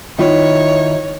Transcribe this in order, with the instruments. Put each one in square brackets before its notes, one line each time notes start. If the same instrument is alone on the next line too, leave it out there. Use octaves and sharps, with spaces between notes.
[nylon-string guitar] D#3 E4 F4 [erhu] C#5